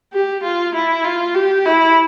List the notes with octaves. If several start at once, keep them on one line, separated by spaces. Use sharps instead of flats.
G4
F4
E4
F4
G4
E4